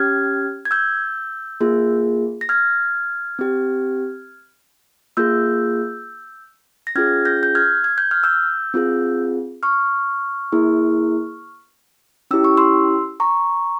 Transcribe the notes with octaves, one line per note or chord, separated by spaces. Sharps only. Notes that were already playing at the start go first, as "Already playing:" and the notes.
Already playing: C#4 G4 F6 G#6
G#6
E6 G6
A#3 F4 G#4
A#6
F6 G#6
C4 G4
A#3 F4 G#4 E6 G6
A#6
C#4 F4 G#4 F6 G#6
G6 A#6
G6
F6 G#6
G#6
G6
F6
E6 G6
C4 F4 G#4
C#6 F6
A#3 E4 G#4
C#4 E4 G4 E6
C#6
C6 E6
A#5 C#6